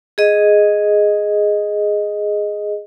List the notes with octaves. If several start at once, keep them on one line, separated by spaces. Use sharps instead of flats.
G#4 D#5